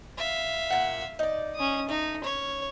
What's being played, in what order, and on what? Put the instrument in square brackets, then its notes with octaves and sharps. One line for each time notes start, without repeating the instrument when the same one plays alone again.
[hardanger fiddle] E5 F5
[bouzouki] A#2 F#5
D#4 D5
[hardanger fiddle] C#4 D#6
[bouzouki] A3 [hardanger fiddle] D#4
[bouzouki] C#4 [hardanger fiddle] C#5